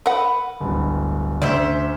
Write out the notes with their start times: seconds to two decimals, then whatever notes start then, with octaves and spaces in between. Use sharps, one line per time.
0.06 A#4 B4 F#5
0.61 D1 G1
1.42 D2 C#4 C5 D5 E5